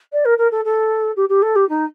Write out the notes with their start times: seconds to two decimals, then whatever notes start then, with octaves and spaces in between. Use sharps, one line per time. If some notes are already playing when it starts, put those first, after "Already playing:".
0.12 D5
0.25 A#4
0.38 A#4
0.51 A4
0.65 A4
1.16 G4
1.29 G4
1.42 A4
1.55 G4
1.69 D#4